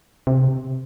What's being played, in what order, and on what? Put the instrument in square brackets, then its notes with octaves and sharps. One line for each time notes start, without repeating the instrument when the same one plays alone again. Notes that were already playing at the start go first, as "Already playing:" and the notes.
[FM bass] C3